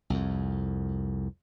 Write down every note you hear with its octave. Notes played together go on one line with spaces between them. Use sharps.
C2 F2